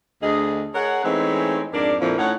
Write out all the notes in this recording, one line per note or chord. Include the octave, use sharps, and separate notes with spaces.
D2 G#4 D#5
G#4 A#4 C#5 F#5
E3 G#3 A3 C4 C#4 D#4
F2 G#2 D4 A#4 D5
F2 A#2 D3 F3 A#3 E4
A2 C#4 D#4 C#5 F#5